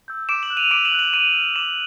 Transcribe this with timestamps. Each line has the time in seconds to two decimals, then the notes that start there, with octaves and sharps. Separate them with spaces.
0.08 E6 G6
0.29 D6 D7 E7
0.43 E7 F#7
0.50 F#6
0.57 D#7 F7
0.71 D6 D7 E7
0.85 E7 F#7
0.92 F#6
0.99 E7 F#7
1.13 D6 D#7 F7
1.35 F6
1.56 D6 E7 F#7